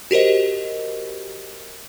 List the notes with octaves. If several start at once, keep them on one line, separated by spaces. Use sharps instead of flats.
F#4 G4 A#4 C5 D#5